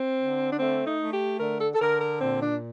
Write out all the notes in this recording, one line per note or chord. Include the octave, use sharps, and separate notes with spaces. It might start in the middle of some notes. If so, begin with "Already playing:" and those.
Already playing: C4
D3
D4
A3 C4
D#4
A3
G4
D3 A#4
A4
A4
D3 A#4
A#4
A#2 C4
D4